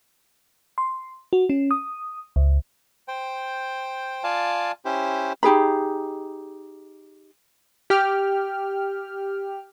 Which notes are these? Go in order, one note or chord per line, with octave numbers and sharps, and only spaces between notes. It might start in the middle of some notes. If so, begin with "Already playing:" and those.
C6
F#4
C#4
D#6
C#2
C5 G5
F4 D5 F5 G#5 A5
C#4 E4 G4 C5
D#4 G4 G#4 B5
G4 G5 F6